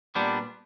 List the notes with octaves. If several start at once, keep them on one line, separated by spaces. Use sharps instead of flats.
A#2 G3 B3 D4